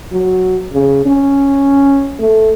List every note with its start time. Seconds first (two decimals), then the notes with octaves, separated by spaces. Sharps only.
0.12 F#3
0.73 C#3
1.06 C#4
2.19 A3